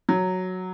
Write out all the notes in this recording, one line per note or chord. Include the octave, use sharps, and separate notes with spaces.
F#3